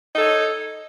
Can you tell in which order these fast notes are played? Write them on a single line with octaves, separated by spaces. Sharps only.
D#4 A4 C#5